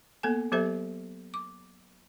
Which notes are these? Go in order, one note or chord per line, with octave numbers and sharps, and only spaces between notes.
A#3 B3 A4 G#5
F#3 B3 G4 A4 C5 E5
D6